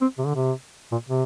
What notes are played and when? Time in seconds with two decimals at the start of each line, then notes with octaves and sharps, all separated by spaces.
0.01 C4
0.18 C3
0.26 D3
0.35 C3
0.92 A#2
1.09 C3